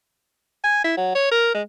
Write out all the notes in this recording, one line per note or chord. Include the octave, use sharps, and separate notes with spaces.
G#5
E4
F#3
C#5
A#4
G#3